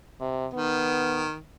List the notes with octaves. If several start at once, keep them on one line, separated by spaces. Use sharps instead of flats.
C3
D#3 B3